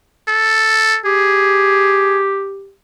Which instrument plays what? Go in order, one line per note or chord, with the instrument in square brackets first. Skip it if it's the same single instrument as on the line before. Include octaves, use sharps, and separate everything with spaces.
[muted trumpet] A4
[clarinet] G4 [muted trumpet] G#4